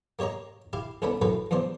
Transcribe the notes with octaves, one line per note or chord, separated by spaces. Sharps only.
A#3 G4 C#5 D#5 A#5
E4 G4 F5
C2 C#3 B3 D4 A4 B5
F#2 A2 F#4 A4 B4
E2 G2 F3 D4 C5